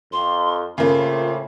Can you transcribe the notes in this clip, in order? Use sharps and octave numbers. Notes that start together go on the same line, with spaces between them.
F2 C6
A2 C#3 A#3 C4 E4 F4